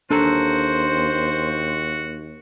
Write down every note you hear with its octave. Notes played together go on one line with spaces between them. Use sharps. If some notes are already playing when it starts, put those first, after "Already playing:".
D#2 D4 F#4 A4 C5 A#5